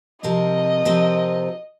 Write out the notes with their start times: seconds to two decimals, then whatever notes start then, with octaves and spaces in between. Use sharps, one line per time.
0.23 C3 F3 C4 F4 A#4 D#5
0.85 C3 F3 C4 F4 A#4